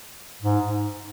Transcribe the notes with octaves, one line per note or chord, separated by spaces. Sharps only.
G#2